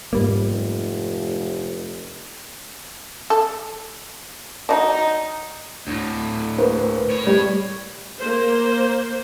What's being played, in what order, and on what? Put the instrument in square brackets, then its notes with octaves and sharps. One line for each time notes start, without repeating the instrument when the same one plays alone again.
[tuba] F1 [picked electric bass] G#2 G3 A#3
[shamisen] A4
[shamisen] F#3 D4 [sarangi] D#4
[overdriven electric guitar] D2 A2
[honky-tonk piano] A#3 B4 C5
[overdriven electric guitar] A2 C#5
[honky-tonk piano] G3
[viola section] A#3 C5